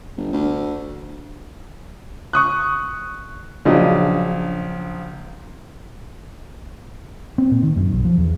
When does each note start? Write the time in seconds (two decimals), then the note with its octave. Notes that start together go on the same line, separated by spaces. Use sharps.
0.17 G1
0.33 D2
2.33 C#6 D#6 F#6
3.65 A#1 C#3 F#3 D4 D#5
7.38 C4
7.51 A#2
7.63 D#3
7.76 F#2
7.92 B1
8.05 F3
8.18 E2